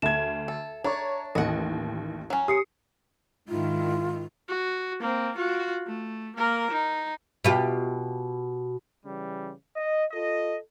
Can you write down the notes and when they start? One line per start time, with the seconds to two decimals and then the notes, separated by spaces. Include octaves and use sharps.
0.02 D2 E5 A5 G#6 E7
0.48 A4
0.84 D4 C#5 A#5 C#6
1.35 A1 D#2 D#5 F#5
2.30 F#3 C#4
2.48 G4 D#6 C7 C#7
3.49 G#2 D#3 E4 F4
4.49 F#4
5.00 A#3 C4
5.37 F4 F#4
5.87 A3
6.37 A#3 A#4
6.71 D#4
7.45 B2 F4 G4
9.05 C#3 E3 G3
9.76 D#5
10.12 F4 A4 D#5